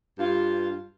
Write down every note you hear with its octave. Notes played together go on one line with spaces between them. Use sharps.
G2 F4